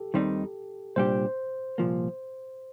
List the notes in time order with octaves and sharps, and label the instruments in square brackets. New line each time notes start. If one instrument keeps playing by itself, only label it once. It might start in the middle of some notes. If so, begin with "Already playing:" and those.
Already playing: [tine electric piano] G4 A4
[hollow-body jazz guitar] D#2 D#3 G3 C4 D#4
[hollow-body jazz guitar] C2 A#2 G3 D4 G4 [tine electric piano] C5
[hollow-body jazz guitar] C2 A#2 F3 A#3